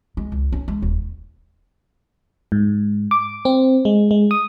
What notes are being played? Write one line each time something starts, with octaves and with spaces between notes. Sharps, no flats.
G#3
C#2
C#4
G#3
D#1
G#2
D6
C4
G#3
G#3
D#6